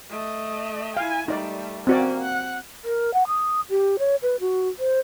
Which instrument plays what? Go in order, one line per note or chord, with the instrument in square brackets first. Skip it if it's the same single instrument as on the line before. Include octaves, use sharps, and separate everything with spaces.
[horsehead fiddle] A3 D#5
[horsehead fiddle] E4 G#5 [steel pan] F5
[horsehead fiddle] G3 A3 [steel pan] D#4 D5
[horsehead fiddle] A#3 C#4 [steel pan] C4 F#4 D5
[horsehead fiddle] F#5
[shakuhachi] A#4
F#5
D#6
G4
C#5
B4
F#4
C5